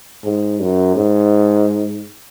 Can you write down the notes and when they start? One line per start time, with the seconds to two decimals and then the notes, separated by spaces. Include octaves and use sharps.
0.25 G#2
0.60 F#2
0.96 G#2